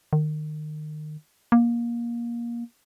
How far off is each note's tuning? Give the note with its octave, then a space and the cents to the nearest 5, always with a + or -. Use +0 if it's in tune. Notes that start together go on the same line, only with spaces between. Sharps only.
D#3 -30
A#3 +20